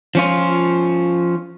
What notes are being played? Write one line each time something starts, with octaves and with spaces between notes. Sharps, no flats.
F3 C#4 F4